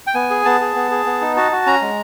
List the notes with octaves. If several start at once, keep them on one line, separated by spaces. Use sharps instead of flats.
G5
B3 G#5
G#4
B3 A5
G#4
B3
G#4
B3
D#4
F#4 A5
F#4
C#4 A#5
G#3